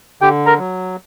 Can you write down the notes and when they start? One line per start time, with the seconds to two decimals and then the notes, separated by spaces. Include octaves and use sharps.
0.21 D3 G4 G5
0.46 A#4 A#5
0.59 F#3